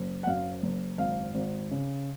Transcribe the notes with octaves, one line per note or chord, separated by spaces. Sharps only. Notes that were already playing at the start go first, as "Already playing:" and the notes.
Already playing: F#1
F#5
F#2 F5
F#1
G#1 F5
G#1
C#3